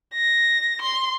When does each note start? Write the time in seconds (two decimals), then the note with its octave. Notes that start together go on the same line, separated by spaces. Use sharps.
0.15 A#6
0.82 C6